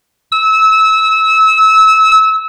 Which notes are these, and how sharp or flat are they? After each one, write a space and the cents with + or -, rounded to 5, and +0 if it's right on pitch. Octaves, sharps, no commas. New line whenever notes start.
E6 -25